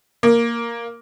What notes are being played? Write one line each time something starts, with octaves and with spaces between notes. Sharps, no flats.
A#3